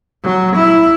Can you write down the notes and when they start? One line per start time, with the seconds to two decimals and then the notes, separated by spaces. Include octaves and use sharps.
0.24 F#3
0.56 E4